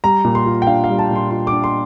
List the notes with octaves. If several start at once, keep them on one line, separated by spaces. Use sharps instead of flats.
G3 A#5
A#2
C6
F4
G5
D4 F5
F5
G3
A5
A#2
C6
F4 C6
D4 D6
C6